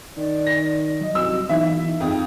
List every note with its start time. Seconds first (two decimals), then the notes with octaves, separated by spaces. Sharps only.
0.17 D#3 D5
0.47 A#6
1.01 F#3 D#5
1.15 C2 F#4 E6
1.49 B1 E3 D#4 E4 E5
2.00 F2 D#4 G#4 F5 G5